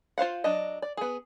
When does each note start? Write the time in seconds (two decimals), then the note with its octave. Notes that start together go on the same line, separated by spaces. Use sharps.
0.18 F4 C5 F5 F#5
0.44 F#3 D4 D#5
0.82 D5
0.97 B3 G#4